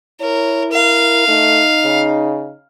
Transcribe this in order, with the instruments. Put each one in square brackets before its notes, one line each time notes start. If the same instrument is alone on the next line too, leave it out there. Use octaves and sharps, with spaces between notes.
[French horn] E4 [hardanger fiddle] A#4 [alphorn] C#5
[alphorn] A#4 [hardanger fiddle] F5
[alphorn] A3 [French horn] D#4
[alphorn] C#3